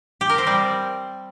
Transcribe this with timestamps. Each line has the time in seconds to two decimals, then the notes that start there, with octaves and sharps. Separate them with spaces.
0.21 G4
0.30 A#4
0.38 C4
0.47 G3